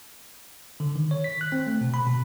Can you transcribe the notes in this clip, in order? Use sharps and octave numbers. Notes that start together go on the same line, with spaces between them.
D3
D#3
C#5
B6
F#6
C4
A3
B2
B5
B2